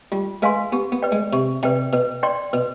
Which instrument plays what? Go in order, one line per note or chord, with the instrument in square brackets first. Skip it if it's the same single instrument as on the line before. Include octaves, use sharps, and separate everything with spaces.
[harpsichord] G3 [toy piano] F4
[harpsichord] G#3 [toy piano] B4 F5 G#5 C6
[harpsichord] B3 [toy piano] G4
[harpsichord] B3
[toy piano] B4 D5 G5
[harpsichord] G#3
[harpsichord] C3 [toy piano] G4
[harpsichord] C3 [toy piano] B4 D5 G5
[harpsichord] B2 [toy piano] B4
[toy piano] D5 G5 C6
[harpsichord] B2 [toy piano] B4